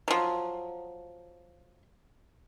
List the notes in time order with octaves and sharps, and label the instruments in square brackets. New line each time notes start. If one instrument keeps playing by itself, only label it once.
[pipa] F3 F#3